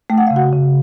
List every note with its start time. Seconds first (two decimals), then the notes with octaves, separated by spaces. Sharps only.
0.10 A3 G5
0.18 F#5
0.27 C#3 F5
0.36 F#4 F#5
0.53 C#3